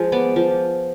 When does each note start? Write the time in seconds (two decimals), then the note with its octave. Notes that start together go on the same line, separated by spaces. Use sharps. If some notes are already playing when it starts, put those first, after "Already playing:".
Already playing: F3 G#3 G#4
0.12 B3 D5
0.36 F3